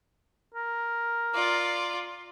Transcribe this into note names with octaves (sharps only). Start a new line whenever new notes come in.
A#4
F4 D5